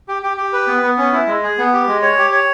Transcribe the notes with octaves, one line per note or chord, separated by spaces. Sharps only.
G4
G4
G4
B4
B3
B3
C#4
E4
G#3
G#4
B3
G4
G#3
C#5
G4
C#5